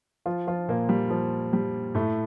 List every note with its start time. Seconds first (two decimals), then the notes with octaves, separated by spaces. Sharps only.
0.26 F3 F4
0.47 F3 F4
0.68 A#2 A#3
0.89 G3
1.10 F3
1.53 G3
1.95 A2 A3